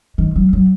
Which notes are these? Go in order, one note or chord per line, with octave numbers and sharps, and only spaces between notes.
D#3
F#3
F#3